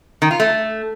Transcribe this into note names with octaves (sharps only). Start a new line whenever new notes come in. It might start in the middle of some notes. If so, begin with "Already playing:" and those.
D#3
F4
A3